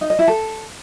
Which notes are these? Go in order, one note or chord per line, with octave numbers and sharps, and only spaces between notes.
D#4
D#5
E4
A4